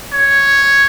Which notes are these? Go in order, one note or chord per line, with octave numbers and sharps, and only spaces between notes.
C#5